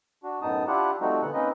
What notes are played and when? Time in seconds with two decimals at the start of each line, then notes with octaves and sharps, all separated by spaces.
0.23 D4 F#4
0.42 F#2 A2 B3 D#4 A5 D#6
0.67 D4 E4 F4 G4 F#5
1.01 F3 G3 A3 C4 D#4 F#4
1.22 A#2 D3 E3 B3 F#5
1.34 A#3 C4 C#4 D#4 B4 D#5